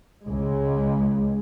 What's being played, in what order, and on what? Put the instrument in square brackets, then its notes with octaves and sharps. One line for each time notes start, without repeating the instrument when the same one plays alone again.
[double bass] C#2 G#3